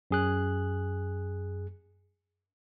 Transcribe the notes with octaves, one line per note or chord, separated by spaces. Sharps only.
F#2 G#4 F#6